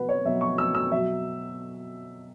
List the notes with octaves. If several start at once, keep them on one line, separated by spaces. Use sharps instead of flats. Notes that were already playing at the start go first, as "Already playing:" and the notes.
Already playing: B2 F#3 B4 F#5
C#5
B2 F#3 E5
C#6
E6
E6
B2 F#3 E5